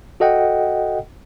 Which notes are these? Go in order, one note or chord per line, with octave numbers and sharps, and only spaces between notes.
F#4 A4 D#5 F#5 G5